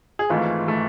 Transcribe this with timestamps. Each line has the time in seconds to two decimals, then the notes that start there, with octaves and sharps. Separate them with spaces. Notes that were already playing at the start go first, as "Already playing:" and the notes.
0.19 G#4
0.30 G#1 G#2 E3 A3 F4
0.66 E3 A3